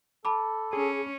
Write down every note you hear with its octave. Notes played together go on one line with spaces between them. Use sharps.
A4 A5 B5 D6
C#4 G#4